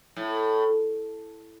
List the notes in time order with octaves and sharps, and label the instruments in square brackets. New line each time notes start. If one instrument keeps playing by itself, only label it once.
[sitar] A2